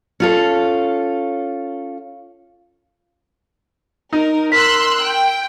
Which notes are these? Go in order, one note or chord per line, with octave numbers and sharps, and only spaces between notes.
C#4 F4 A4
D#4 A#4
A#4 C6 E6 F#6 B6
G5